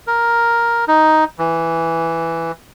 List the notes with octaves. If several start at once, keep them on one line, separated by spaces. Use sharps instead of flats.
A#4
D#4
E3